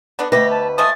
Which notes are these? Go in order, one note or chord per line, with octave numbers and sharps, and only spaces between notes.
D3 B3 D4
D2 B2 G4 B4 E5 A#6
A5
F3 G#3 A3 D#6 A6